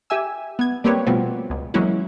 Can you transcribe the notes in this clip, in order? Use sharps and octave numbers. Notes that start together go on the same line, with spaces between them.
G4 E5 G#5 E6
B3 G#6
G3 A#3 C4 G4 B4 C#5
B2 F3 G3 A3 B3 C4
C#2
E3 F#3 G#3 A#3 C#4 E4